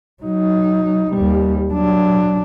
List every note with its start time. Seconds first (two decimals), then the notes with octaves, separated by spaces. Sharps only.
0.23 F#3 D#4
1.13 D#2 G3
1.69 F#3 D4